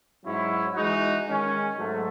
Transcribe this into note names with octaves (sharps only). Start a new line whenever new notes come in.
G#2 F#3 C#4 E4
E3 G#3 D#4 F#4
D#3 G#3 C#4
G#2 F#3 A3